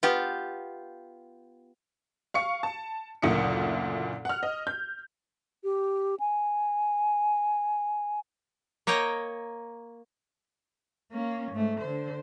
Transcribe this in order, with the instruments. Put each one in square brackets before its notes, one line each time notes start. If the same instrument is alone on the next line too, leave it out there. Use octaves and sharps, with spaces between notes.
[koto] B3 F4 G4
[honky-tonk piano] F5 C#6 C#7
A5
F#1 D2 A#2 E4 D#6 C#7
F#5 F6
D#5
G6
[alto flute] G4
G#5
[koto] A#3 C#5 D#5 G5 A#5
[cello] A#3 C#4
G#2 A3
D3 C5